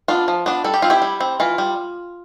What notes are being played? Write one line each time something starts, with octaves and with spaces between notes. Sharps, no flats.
B3 D4 F4
F3
B3 D4
G3 A4
G4
C4 F4
E4 G4
G3
C4
E3 F4
G3